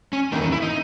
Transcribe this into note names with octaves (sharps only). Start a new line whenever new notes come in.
C#4
E2 D#3 A#3 D#4
C#4
E4
D#4